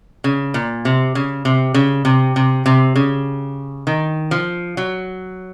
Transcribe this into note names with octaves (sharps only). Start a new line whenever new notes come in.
C#3
A#2
C3
C#3
C3
C#3
C3
C3
C3
C#3
D#3
F3
F#3